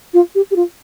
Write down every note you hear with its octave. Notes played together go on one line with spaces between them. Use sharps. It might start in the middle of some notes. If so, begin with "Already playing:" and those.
F4
G4
G4
F4